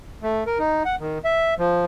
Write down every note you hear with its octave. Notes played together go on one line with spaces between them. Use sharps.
A3
A#4
D#4
F#5
D#3
E5
F3